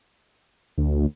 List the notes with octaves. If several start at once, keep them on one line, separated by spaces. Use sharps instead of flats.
D2